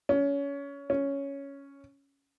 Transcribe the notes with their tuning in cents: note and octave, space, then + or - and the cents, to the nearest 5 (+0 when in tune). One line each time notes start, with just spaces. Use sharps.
C#4 +25
C#4 +5